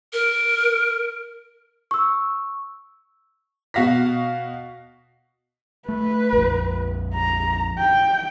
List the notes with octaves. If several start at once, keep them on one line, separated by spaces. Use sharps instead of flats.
A#4
C#6 E6
B2 F#4 F5 A#6 B6
A3 B4
A#1 F2
A#5
G5